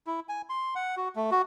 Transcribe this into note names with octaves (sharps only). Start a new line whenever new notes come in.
E4
G#5
C6
F#5
F#4
A3
F#4